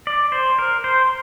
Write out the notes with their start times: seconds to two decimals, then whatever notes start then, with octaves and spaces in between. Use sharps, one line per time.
0.07 D5
0.32 C5
0.59 A#4
0.84 C5